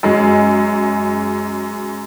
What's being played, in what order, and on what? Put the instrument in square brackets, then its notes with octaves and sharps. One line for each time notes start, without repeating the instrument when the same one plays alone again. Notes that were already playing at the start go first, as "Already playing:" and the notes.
[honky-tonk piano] F#2 G#3